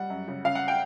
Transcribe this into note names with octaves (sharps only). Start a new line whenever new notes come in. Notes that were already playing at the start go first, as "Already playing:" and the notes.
Already playing: G3 F#5
F#2
C#3
C#3 F5
F#5
G5